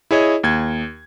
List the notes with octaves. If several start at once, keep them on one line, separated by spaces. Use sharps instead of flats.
E4 G#4 C#5 D#5
D#2 G#6